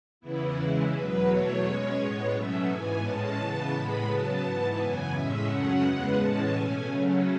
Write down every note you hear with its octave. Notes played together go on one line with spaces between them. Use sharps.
E2 C#3 E3 B3 E4
C#3 E3 G#3
E2 B2 F#3 B4
E2 B2 F#3 A3 C#5
B2 G#3 C#4 C#5
A2 G#3 B3 C#5
B2 F#3 A3 C#4 E5
G#2 E3 B3 G#5
A2 G#3 C#4 A5
C#3 E3 B3
A2 G#3 B3 B5
C#3 F#3 B3 A5
G#2 E3 B3
F#2 C#3 E3 B3 G#5
A2 G#3 C#4 E5
F#2 C#3 F#3 A3 C#4 F#5
E2 C#3 G#3 B3 F#5
A2 E3 G#3 C#4 A5
B2 A3 C#4 G#5
C#3 F#3 A3 C#4